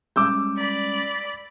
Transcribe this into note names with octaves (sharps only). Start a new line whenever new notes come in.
G3 G#3 C#4 D6 E6 G6
D5 B5